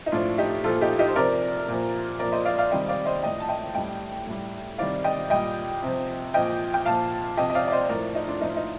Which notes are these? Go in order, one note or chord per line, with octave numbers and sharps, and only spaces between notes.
D#4
A2 F3 D4 F4
D#4 G4
A#2 F3 F4 A4
D#4 G4
D#4 G4
C5
C3 F3 A#4 D5
A#2 F3
A#2 F3 A#4 D5
C5 D#5
D5 F5
D5 F5
C3 D#3 G3 D#5 G5
D5 F5
C5 D#5
A2 F3 D#5 G5
A5
D#5 G5
A2 G3 D#5 G5
A2 G3
C3 D#3 G3 D5 F5
D#5 G5
A#2 G3 D#5 G5
C3 F3
A#2 F3 D#5 G5
G5
A#2 F3 F5 A5
C3 F3 D#5 G5
D#5
D5 F5
D5
C5 D#5
A2 F3 A#4 D5
D#4
D4 F4
A2 F3 D#4
F4
D#4